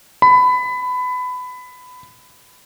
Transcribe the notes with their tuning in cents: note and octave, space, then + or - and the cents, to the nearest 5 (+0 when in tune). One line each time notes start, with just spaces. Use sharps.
B5 +20